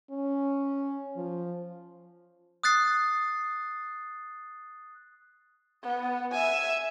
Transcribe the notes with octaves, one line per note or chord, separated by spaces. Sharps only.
C#4
F3
D#6 F#6 A6 C7
B3
E5 G#5